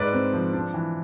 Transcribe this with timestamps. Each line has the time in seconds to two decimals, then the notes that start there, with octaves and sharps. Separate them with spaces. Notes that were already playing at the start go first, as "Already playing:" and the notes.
Already playing: G#2 B4 D5
0.13 C4
0.33 F3
0.53 D4
0.74 E3